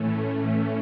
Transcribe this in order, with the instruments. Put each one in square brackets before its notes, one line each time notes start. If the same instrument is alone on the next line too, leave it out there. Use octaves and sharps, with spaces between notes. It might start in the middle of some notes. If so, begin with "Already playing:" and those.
Already playing: [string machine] A2 E3 A3 C#4